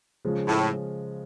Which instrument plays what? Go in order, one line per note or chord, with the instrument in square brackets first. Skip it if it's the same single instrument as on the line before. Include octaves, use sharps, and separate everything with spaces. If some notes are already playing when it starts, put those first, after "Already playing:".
[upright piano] C#3 F3 G#3 C#4
[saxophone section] A2